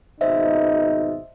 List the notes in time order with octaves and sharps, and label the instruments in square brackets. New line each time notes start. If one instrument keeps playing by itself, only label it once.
[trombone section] G#1 B2 D#4 [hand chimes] C5 D#5 E5